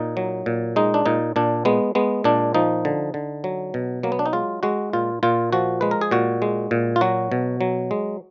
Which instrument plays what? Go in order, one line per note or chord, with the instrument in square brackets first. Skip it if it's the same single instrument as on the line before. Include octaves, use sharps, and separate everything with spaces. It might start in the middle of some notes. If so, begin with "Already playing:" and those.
Already playing: [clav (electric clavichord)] A#2 D#4
F#3
A#2
G#3 D#4
D4
A#2 D#4
A#2 D4
G#3 B3
G#3 B3
A#2 D4
F3 D#4
D3
D3
F#3
B2
F#3 A#3
B3
D4
D#4
G#3 F4
G#3 F#4
A#2 F4
A#2 F4
F3 F#4
G#3 B4
A#4
G#4
A#2 F#4
G#3
A#2
F4
F#3 F#4
B2
F#3
G#3